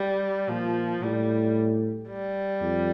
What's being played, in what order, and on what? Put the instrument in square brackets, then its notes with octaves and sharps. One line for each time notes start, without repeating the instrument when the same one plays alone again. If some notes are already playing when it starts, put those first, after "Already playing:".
Already playing: [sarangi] G3
[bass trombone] A#2 [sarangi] F3
[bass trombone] A2 [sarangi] G3
[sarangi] G3
[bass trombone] F2